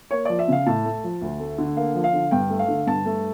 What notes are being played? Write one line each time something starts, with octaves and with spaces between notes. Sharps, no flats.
A#3 C#5
F3 D5
E5
C#3 F5
A2 A5
A3
F3
D2
A3
D3
A#3 F5
F3
F5
D3
G2 G5
A3
F5
D3
G2 A5
A3